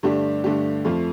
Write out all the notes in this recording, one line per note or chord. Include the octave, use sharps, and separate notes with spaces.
G2 D3 A3 D4 G4
G2 D3 A3 D4 G4
F2 F3 A3 F4